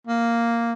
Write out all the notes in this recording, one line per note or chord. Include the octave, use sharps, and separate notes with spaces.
A#3